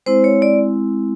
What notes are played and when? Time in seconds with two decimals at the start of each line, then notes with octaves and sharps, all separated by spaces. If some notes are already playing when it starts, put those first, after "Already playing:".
0.06 G#3 C4 E4 C5
0.24 C#5
0.42 D5